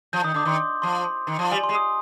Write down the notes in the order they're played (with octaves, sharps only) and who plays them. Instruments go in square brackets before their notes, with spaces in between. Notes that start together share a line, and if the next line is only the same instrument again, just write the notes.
[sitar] F3 [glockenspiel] G6
[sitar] D#3 [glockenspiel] D#6
[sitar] D3 [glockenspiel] D6
[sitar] D#3 [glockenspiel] C6
[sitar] F3 [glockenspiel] C6
[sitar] D#3
F3
[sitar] G3 [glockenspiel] G#5
[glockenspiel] C6
[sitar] G#3
[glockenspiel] D#6